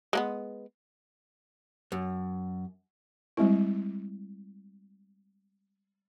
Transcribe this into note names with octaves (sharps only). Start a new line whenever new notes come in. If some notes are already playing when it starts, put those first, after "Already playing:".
G#3 A#3 B3
F#2
G3 G#3 C4 E4